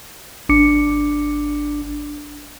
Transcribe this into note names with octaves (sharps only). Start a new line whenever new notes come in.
G#1 D4 D6 C#7